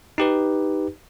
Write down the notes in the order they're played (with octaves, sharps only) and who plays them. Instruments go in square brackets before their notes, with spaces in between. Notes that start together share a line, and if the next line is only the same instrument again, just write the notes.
[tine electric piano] D#4 G4 B4